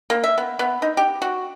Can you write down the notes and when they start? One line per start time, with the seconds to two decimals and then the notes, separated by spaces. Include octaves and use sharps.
0.10 A#3
0.24 E5
0.38 B3
0.59 B3
0.82 D#4
0.97 G4
1.22 F#4